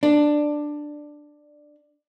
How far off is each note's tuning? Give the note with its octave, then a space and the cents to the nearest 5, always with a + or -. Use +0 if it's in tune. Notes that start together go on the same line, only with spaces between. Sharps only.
D4 +10